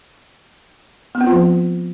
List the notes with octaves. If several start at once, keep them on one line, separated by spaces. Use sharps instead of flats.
B3
C4
F4
F3